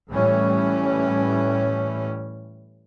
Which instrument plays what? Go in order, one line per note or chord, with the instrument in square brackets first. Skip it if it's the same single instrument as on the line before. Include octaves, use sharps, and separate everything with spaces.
[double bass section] A2 E3 G3 C#4